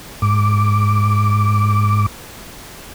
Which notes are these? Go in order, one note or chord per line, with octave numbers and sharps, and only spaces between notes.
G#2 D6